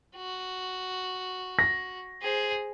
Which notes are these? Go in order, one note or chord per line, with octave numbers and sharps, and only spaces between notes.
F#4
A#6
G#4 C5